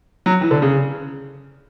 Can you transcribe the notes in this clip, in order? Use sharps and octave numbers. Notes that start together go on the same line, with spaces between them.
F#3
E3
D3
C#3